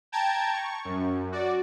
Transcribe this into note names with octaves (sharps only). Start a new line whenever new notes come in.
G5 A5 A#5 G#6
C#6
F#2
F#4 D5